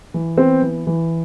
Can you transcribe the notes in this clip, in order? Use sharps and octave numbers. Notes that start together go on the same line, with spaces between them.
E3
B3 C4 C5
E3
E3